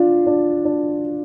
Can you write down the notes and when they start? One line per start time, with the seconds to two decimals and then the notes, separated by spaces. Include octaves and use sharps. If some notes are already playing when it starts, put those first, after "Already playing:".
Already playing: D4 F4
0.26 D4
0.65 D4